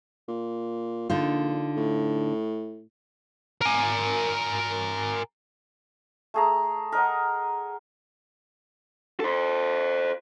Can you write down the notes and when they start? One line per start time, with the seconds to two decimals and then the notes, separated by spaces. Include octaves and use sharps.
0.28 A#2
1.10 A#1 D3 D#4 F4
1.77 A2
3.61 A#4 G#5
6.34 A3 G#4 A#5
6.92 A#4 D#5 F#5
9.20 A4 C5